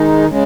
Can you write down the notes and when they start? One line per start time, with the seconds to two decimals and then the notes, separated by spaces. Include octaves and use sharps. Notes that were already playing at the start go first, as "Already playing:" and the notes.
Already playing: D#3 G#3 D#4
0.28 C#3 G#3